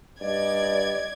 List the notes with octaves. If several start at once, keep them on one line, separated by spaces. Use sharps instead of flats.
G2 D5 D#5 G#6